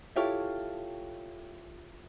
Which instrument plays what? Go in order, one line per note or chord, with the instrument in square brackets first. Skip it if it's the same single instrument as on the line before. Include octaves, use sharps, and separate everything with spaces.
[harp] E4 F4 G4 A4 C#5 F5